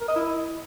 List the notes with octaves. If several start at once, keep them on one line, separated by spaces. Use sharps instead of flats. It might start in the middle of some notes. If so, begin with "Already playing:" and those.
A#4
D#5
E4